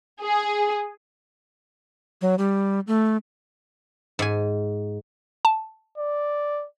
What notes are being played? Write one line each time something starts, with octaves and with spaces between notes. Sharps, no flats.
G#4
F#3
G3
A3
G#2 G#5
A5
D5